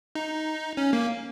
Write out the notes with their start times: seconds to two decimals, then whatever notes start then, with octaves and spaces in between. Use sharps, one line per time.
0.15 D#4
0.77 C#4
0.93 A#3